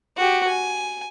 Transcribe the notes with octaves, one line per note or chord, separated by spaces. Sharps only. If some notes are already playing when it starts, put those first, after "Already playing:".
F#4 G4
G#5